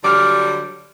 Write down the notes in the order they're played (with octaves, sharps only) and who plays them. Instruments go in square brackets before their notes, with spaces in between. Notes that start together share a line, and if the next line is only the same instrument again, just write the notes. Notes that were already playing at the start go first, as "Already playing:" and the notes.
[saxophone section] D3 F#3 G3 [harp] D6 F6